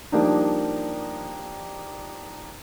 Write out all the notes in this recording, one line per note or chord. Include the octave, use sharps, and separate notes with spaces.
F3 G3 A#3 D4 D#4